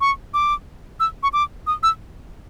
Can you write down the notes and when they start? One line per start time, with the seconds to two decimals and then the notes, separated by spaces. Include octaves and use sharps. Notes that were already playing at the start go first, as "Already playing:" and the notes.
0.01 C#6
0.34 D6
1.00 E6
1.23 C#6
1.33 D6
1.67 D#6
1.83 E6